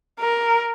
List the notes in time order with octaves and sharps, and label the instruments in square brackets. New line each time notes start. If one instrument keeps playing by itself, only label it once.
[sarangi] A#4